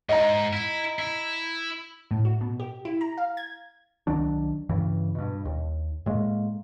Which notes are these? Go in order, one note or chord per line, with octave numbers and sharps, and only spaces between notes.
G#2 D#5 A#5
E4
E4
A2
F#4
B2
G4
E4
A#5
F5
G#6
C2 D#3 F#3 D4
G2 C#3 E3
G2 B2
D#2
A2 G#3 A#3